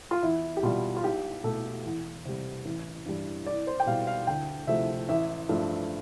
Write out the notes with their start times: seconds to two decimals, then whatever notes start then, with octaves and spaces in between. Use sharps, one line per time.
0.11 F4
0.22 E2 E4
0.57 G4
0.63 B2 G3 F4
0.96 F4
1.03 B1 G4
1.44 B2 A3 A4
1.85 E2
2.25 C3 G3
2.65 A1
3.06 G2 E3 G3
3.46 C2 D5
3.67 C5
3.80 G5
3.86 B2 G3 F5
4.07 F5
4.27 D2 G5
4.67 C3 F3 A3 E5
5.09 A1 E5
5.49 G2 F3 A3